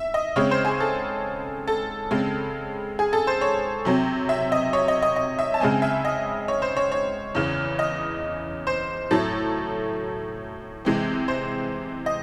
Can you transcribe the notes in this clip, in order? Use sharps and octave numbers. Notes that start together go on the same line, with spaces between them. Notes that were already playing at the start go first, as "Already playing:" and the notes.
Already playing: E5
D#5
C#3 G#3 C4 C#5
C5
G#4
A4
A4
C#3 G#3 C4
G#4
A4
C5
C#5
C3 F#3 C4
E5
D#5
C#5
D#5
D#5
D#5
E5
A5
C#3 G#3 C4 G#5
E5
D#5
C#5
C5
C#5
C#5
E2 C#3 E3
D#5
C5
A2 F#3 A3 A4
C3 E3 G#3 C4
C5
D#5